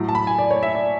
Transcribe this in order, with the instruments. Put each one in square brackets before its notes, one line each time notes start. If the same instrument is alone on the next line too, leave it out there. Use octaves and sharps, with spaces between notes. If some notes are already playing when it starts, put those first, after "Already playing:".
Already playing: [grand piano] A2 F#3
A5
B5
G#5
D5
C#5
E5
D5